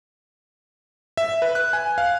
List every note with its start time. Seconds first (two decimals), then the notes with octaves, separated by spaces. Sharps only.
1.17 E5
1.42 B4
1.55 F#6
1.73 G#5
1.98 F5